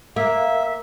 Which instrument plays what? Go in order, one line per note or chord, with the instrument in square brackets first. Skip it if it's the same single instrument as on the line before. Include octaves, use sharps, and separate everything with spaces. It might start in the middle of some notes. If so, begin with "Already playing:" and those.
[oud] A#3 [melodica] E5